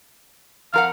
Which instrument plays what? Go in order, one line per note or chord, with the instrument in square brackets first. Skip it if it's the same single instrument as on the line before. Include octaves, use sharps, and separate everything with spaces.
[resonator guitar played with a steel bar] F2 A#4 F#5 [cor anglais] F5